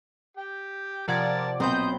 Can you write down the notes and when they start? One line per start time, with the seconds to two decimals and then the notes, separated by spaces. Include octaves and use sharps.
0.37 G4 G5
1.08 C3 F3 A#4 D5 F#5 A5 G#6
1.60 B1 A#2 B3 C4 C5 D#5 G6